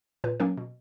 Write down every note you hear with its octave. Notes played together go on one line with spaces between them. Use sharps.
A#2 B4
F#3 A#3 C#4 A#4
B2